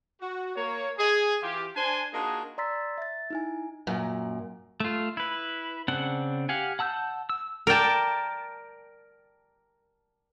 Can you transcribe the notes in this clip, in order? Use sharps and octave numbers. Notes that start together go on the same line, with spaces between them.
F#4
A#3 C#5
G#4
E3 F4 G4
D4 C5 G#5
A#3 D4 D#4 F4 F#4 G#4
D5 A#5 C6 E6 A6 B6
E5 A6
D#4 E4 G#5
F#2 A#2
A3 F4
E4 B4
C#3 C4 D4 F#5
G4 F5 F#5 G#5
F#5 A5 E6 F6 G6
E6
A#4 D5 G5 A5